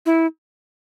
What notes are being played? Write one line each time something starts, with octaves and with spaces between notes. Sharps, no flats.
E4